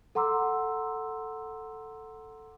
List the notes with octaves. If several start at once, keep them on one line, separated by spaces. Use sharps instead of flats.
A4 F#5 A#5 C6 D6 E6